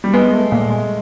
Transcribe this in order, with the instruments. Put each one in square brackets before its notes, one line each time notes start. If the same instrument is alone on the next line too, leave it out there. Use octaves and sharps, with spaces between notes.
[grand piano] G3
[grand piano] G#3 [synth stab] B3
[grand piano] A3
[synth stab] A#2
[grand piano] G#3